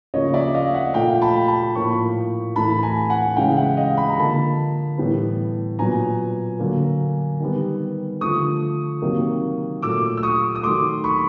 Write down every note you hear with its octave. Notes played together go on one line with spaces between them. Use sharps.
C#3 F3 A#3 C#5 D#5
D5 E5
D#5 F5
E5 F#5
A#2 F3 A3 F5 G5
A5 B5
A5 B5
A2 F3 A#3 B5 C#6
A2 E3 A3 A5 B5
B5
G#5 A#5
F#5 G#5
C#3 E3 G#3 F5 G5
E5 F#5
D#5 F5
B5
A#5
D3 F3 A#3 A5 B5
A2 E3 G3 B3
A#2 F#3 B3 G#5 A#5
D3 F#3 A#3
D#3 G3 B3
D3 F3 A3 C#6 D#6
C3 D#3 F#3 A#3
A#2 F#3 A3 D6 E6
E6
C#6 D#6
D#6
D#3 F#3 A3 C6 D6
B5 C#6